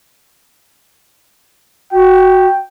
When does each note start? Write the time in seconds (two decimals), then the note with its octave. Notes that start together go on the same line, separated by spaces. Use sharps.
1.92 F#4 G5